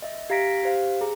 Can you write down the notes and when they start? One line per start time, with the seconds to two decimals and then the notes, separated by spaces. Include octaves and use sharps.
0.02 D#5 E5
0.30 G4 F5 A#5 A#6 B6 D7
0.63 G4 C5 F5
1.01 G#4 A#5